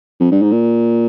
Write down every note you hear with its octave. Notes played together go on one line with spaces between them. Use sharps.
F2
G2
G#2
A#2